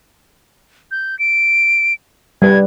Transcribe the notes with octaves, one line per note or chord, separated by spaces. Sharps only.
G6
D7
G3 B4 G#6